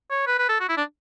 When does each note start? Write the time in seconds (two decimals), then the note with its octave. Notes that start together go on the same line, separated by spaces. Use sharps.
0.10 C#5
0.27 B4
0.38 B4
0.49 A4
0.60 F#4
0.69 E4
0.77 D4